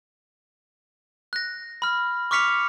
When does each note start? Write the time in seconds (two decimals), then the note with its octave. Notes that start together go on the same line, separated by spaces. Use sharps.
1.33 F#6 A#6
1.82 B5 F6
2.31 C#6 D6 F6 B6 C#7 F7